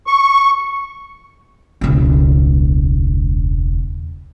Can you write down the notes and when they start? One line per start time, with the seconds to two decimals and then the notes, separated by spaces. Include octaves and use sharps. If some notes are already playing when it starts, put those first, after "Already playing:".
0.07 C#6
1.81 E1 C#2